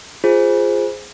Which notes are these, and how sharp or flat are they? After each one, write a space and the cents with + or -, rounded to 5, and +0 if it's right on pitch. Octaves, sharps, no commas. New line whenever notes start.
F4 +0 G#4 +0 C5 +0